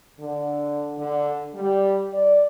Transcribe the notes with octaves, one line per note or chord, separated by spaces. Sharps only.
D3
D3
G3
D5